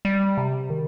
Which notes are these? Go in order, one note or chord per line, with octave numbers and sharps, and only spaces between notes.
G3
C3
D#3